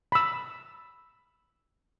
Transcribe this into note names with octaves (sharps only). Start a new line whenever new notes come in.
B5 E6